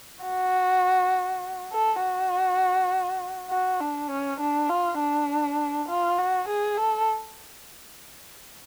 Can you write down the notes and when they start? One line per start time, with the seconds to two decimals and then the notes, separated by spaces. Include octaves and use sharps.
0.24 F#4
1.72 A4
2.02 F#4
3.50 F#4
3.80 D4
4.09 C#4
4.40 D4
4.69 F4
5.00 D4
5.88 F4
6.18 F#4
6.48 G#4
6.77 A4